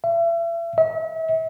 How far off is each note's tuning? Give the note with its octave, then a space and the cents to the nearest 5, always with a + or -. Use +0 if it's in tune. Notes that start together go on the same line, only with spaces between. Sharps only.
E5 +35
E5 -40